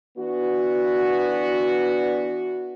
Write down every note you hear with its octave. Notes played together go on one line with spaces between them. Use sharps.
E3 B3 D4 F#4